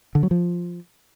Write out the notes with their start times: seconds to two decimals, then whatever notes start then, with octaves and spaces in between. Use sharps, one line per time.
0.15 D3
0.23 F#3
0.31 F3